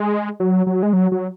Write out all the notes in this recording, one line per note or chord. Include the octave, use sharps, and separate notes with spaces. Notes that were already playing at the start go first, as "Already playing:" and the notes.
Already playing: G#3
F#3
F#3
G#3
F#3
F#3